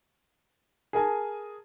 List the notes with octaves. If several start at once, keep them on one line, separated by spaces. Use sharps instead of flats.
G#4 A#4 G#5 A5